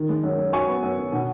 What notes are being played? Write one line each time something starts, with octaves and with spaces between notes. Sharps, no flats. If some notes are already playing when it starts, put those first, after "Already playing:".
Already playing: D#3
G#3
F#2
F#2
F#3 G#5 C#6
B3
F#2
F#2
B2